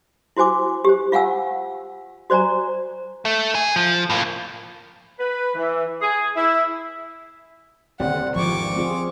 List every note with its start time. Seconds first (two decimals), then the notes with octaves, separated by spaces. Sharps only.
0.37 E4 F#4 C5 G#5 D6
0.85 G4 C5
1.12 F4 F5 F#5 G#5 E6
2.30 F#4 C5 D5 G#5 A#5
3.25 A3
3.55 G#4
3.76 F3
4.10 A2 A#3
5.19 B4
5.55 E3
6.01 G#4
6.36 E4
8.00 D#1 D2 G3 C4 F#5
8.35 G#1 E2 F3 C#6 D6
8.76 C4 F4 G#4